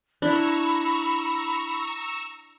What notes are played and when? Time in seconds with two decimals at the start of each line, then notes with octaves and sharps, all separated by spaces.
0.22 D4 E4 A#5 B5 C#6 E6